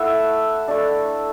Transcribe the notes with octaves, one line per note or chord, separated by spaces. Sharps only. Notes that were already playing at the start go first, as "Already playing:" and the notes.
Already playing: A3 E4 E5 F#5
A3 D4